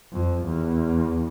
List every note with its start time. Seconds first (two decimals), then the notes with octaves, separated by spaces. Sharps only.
0.13 F2
0.46 E2